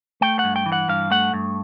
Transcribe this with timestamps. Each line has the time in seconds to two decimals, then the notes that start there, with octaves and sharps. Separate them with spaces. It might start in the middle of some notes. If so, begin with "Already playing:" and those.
0.21 A3 G5
0.39 G2 F#5
0.56 G5
0.66 E3
0.72 F#5
0.89 G2 F5
1.11 A3 F#5
1.34 G2